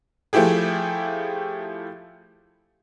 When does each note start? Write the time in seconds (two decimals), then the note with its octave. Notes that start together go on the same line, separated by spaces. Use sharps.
0.33 F3 A3 E4 G4 G#4